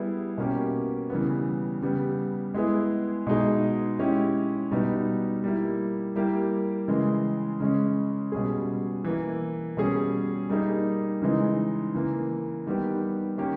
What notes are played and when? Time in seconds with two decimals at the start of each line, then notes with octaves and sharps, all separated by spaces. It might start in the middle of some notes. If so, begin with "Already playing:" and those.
Already playing: G3 B3 E4 G#4
0.38 B2 A#3 C#4 G4
1.10 C#3 E3 G3 B3
1.82 C#3 G3 B3 G4
2.54 G#3 B3 E4 G#4
3.27 B2 G#3 D#4 G#4
3.99 G#3 C#4 E4 G4
4.71 B2 G3 B3 D#4
5.44 G3 A#3 E4
6.16 G3 A#3 E4 G4
6.88 C#3 E3 G#3
7.60 C#3 G#3 C#4
8.32 B2 G3 C#4 G#4
9.04 E3 A#3 E4
9.77 B2 G3 C#4 G#4
10.50 G3 A#3 D#4 G#4
11.22 C#3 E3 G#3 D#4
11.94 C#3 E3 A#3
12.67 D#3 G3 B3 G4
13.38 D#3 A#3 C#4 G4